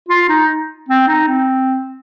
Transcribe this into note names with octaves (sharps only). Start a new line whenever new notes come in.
F4
D#4
C4
D#4
C4